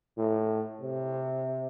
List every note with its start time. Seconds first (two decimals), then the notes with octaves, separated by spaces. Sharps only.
0.18 A2
0.82 C3